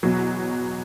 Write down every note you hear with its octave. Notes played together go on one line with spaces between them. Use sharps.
E2 B2 F#3